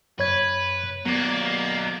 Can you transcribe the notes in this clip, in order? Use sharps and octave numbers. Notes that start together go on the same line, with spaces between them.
F#2 B4 C#5 G#6
F#3 A#3 B3 D5